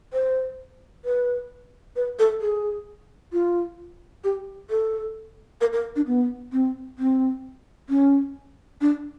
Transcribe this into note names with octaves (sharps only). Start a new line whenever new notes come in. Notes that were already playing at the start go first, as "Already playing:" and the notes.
C5
B4
B4
A4
G#4
F4
G4
A4
A#4
A#4
D4
B3
C4
C4
C#4
D4